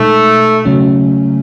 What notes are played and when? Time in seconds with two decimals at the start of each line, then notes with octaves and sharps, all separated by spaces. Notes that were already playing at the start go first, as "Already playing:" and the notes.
Already playing: B2 G#3 A3 D#4
0.65 C#3 F#3 A3 C#4